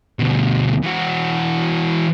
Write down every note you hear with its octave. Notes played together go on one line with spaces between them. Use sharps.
D2 B2
E3 F#4